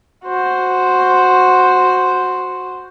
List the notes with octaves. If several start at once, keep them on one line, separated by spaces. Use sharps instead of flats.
F#4 C5